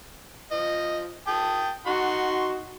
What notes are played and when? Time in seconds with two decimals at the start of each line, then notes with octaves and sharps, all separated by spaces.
0.52 F3 D#5
1.27 G5 A5 D#6
1.86 D#4 F#4 F#5 C6 C#6